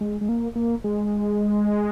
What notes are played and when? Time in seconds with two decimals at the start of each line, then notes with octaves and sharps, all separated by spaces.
0.01 G#3
0.21 G#3
0.29 A#3
0.56 A#3
0.84 G#3